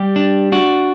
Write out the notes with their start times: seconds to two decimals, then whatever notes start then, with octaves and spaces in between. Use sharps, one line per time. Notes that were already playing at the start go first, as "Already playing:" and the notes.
Already playing: G3 G4
0.16 D4
0.52 D4 F#4